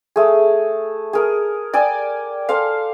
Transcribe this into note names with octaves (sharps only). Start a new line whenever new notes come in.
A3 G#4
G#4 A#4
D5 G5 G#5 E6
A4 C5 F5